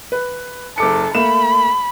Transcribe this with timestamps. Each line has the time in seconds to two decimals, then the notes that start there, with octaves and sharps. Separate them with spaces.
0.12 B4
0.78 F#1 A4 D6 C#7
1.15 A3 A#3 B5 E7